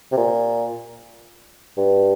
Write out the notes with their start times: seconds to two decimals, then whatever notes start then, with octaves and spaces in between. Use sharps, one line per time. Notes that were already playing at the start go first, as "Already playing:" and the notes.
0.12 C3
0.17 A#2
1.77 G2